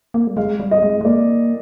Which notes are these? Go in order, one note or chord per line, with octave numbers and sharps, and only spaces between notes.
A#3
G3
G#3 F5
G3
D#5
G#3
G#3
A#3 D5